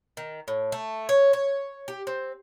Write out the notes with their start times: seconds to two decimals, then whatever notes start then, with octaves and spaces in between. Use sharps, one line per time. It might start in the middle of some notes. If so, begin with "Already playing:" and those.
0.17 D#3
0.48 A2
0.72 A3
1.09 C#5
1.33 C#5
1.88 G4
2.07 C4